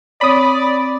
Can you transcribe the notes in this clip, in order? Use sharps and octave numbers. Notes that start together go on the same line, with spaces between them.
C4 C#5 D5 B5 D#6